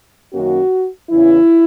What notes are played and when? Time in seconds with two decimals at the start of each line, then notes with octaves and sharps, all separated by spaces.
0.34 F#2 D#3 A#3 C#4 F#4
1.11 E2 C#3 E3 E4